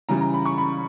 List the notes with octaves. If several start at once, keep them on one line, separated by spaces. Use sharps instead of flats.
C#3 E3 G3 A#5
A#5
B5
C#6
B5